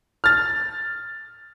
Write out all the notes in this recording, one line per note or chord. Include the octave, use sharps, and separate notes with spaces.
F6 A6